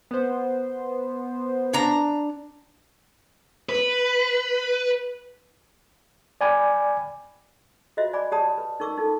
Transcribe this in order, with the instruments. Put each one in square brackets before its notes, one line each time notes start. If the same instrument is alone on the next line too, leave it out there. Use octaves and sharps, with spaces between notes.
[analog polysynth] B3 C5
[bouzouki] D4 A#5
[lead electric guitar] B4
[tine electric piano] D5 G5 G#5 B5 D6
[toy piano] F4 F#4 C5 D#5 E5
D5 G#5 B5 D6
G4 C#5 D5 A5 B5 D#6
B4
D#4 A#4 C#6 D6 E6
D#4 F4 A4